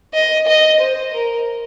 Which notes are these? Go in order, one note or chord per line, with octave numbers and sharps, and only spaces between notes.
D#5
D#5
C5
A#4